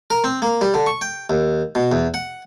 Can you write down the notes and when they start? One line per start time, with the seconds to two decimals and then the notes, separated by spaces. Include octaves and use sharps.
0.10 A#4
0.24 C4
0.42 A#3
0.61 G3
0.74 D3
0.86 C#6
1.01 G5
1.30 D#2
1.75 B2
1.92 E2
2.14 F#5